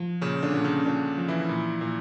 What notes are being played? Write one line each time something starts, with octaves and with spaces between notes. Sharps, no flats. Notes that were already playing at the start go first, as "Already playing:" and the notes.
Already playing: F3
A#2 C#3 C#4
D3 D4
A#2
C#3 C#4
A#2 D3 D4
F3
E3 E4
A#2
A#2